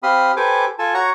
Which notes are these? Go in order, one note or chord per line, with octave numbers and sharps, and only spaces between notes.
C4 G4 F5 B5 C6 D#6
G4 A4 B4 C5 G#5 D6
F4 A4 G#5 A5
F#4 C#5 F#5 A#5 C#6